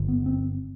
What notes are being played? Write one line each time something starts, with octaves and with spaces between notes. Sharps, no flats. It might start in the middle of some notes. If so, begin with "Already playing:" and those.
Already playing: G1 G2 D3
B3
C4